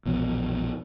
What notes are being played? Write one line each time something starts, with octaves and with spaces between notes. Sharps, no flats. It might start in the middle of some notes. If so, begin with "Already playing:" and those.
A#1 E2 B2